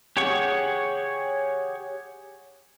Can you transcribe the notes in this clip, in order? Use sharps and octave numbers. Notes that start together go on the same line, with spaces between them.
G4 G#4 C#5 F#5 C#6